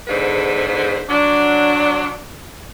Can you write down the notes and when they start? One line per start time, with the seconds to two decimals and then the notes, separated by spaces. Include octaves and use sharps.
0.08 E2 G#2 D3 B4 C5
1.09 F#3 D4